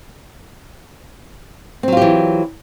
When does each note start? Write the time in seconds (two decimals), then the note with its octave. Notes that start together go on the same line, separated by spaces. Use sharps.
1.83 C4
1.88 F#3
1.92 F4
1.97 G4
2.02 E3